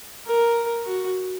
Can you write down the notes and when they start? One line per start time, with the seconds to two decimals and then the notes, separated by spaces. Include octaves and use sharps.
0.26 A#4
0.86 F#4